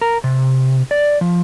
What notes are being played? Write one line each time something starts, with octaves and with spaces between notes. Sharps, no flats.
A#4
C3
D5
F3